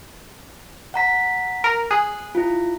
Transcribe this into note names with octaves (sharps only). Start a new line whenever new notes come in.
F#5 A#5 B6
A#4
G#4 F#6
E4 F4